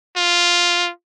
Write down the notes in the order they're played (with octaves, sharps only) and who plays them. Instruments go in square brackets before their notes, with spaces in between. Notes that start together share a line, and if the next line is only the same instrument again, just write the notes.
[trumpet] F4